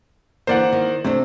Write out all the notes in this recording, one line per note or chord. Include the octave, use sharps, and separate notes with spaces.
D3 E3 A#3 C5 D5 F#5
D#3
C3 A3 C4 D4